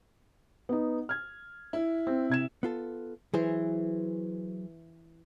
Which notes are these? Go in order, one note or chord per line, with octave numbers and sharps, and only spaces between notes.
B3 D#4
F6 G#6
E4
C4
C3 G#6 E7
B3 F4 A4
E3 F#3 G#4 C5